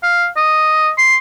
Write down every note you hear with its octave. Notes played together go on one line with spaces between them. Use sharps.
F5
D#5
C6